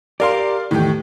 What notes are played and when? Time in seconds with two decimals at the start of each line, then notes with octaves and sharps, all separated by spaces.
0.20 G4 A#4 D5 F5 C6
0.71 E2 A2 D#3 A3 G4